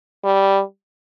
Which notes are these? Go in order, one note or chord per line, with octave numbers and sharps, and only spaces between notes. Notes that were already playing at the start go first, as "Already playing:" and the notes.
G3